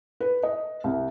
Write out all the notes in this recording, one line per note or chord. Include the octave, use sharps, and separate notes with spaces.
B4
D#5
C2